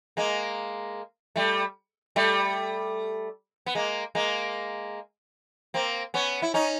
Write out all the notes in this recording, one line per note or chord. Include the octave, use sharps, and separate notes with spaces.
G#3 A#3
G3 A3
G3 A3
B3
G#3 A#3
G#3 A#3
A#3 C4
B3 C#4
E4
C#4 D#4